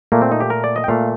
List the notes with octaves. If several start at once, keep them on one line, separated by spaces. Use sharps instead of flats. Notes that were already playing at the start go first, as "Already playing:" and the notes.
A#2 A3 A#3
C4
D#4
G4
A#4
D5
D#5
G5
A#2 A3 F5